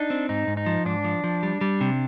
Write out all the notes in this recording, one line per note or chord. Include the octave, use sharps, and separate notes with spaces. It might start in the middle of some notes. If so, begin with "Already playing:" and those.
Already playing: D4 D#4
C4
G#2 D#4
G#2
D#4
F3
G#2 D4
F3
F3
G3
G3
C3